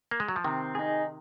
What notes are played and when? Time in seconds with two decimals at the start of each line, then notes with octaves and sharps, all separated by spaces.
0.11 A#3
0.20 G#3
0.28 F#3
0.36 F3
0.44 C3 D#3 C4
0.75 D#4 G#4